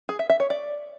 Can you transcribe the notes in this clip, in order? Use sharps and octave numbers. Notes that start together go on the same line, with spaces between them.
G#4
E5
E5
C#5
D5